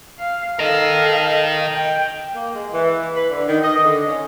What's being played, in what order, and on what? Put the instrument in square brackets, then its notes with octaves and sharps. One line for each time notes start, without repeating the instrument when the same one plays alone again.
[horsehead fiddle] F5
[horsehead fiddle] A4 F5 [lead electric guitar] A#4 D#5
[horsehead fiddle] G5
[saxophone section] A#3
G#3
E3
B4
D3
D#3
D#5
D3
C#4